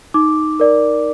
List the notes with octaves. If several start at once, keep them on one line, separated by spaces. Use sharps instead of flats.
D#4 D6
A#4 D5